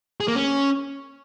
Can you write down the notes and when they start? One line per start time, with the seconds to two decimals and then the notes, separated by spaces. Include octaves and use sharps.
0.20 G#4
0.28 A#3
0.35 C#4